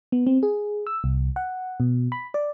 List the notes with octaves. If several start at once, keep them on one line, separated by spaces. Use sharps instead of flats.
B3
C4
G#4
E6
C2
F#5
B2
B5
D5